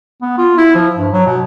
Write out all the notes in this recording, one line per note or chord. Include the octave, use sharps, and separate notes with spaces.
B3
F4
E4
F3
G2
F#3
B2